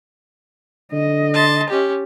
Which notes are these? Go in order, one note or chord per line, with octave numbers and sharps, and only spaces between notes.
D3 D#5
A5 C6
C#4 G4